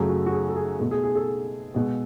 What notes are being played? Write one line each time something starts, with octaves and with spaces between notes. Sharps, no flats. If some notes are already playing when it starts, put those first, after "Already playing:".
Already playing: F#2 C#3 F#3 A3 G#4
F#4
F#4
G#4
A4
G#4
B2 A3
G#4
G#4
A4
B2 G#3